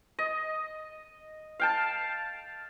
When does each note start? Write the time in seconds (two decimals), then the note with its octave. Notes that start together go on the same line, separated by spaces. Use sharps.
0.19 D#5
1.60 F5 G5 A5